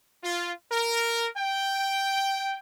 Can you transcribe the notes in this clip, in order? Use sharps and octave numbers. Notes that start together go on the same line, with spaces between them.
F4
A#4
G5